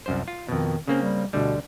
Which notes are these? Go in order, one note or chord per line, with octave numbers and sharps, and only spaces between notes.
C2 F#2 C5
F4
F2 B2 D#3
C#3 A#3 C4 C#4
G3
D2 B2 D3 G3